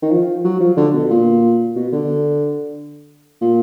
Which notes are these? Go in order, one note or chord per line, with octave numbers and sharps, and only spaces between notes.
D#3
F3
F#3
F3
D3
B2
A#2
B2
D3
A#2